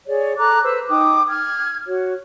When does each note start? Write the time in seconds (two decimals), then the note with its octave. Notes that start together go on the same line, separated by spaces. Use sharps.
0.08 G#4 C#5 D5
0.38 A4 A#5 D6 F#6
0.64 B4 C5 E6
0.88 D#4 G5 D6 D#6
1.29 F6 G#6
1.87 F#4 C#5